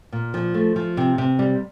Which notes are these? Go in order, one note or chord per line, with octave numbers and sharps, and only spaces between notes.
A#2
F3
A3
F3
C3
C3
G3